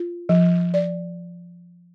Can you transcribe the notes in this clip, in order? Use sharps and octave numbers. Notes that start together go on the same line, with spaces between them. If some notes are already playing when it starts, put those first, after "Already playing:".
Already playing: F4
F3
D5